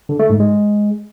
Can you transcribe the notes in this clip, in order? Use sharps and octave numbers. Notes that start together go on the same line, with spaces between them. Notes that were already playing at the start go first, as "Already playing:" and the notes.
D3
A3
G#2
G#3